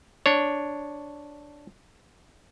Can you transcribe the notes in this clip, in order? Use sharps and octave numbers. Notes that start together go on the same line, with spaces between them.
D4 C#5